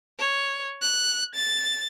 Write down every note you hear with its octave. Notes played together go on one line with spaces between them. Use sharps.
C#5
F#6
A6